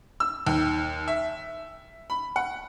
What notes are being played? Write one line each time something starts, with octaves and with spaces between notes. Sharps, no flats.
E6
D#2
E5
B5
F#5